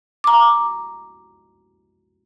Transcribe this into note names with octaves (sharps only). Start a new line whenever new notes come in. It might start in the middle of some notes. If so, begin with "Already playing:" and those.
A#5 D6